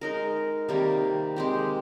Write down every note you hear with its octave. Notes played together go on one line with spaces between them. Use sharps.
G#3 D#4 A#4
C3 D#3 G3 A#3
G#3 C4 G4